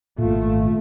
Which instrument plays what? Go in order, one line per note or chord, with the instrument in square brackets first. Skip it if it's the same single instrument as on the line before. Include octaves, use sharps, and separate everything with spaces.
[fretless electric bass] G#1 A#2 [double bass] A3 [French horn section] F4